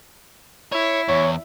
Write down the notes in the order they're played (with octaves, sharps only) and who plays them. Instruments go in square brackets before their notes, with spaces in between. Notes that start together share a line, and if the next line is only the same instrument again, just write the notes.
[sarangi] E4 [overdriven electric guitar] C#5
[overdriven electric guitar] E2 [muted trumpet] C#5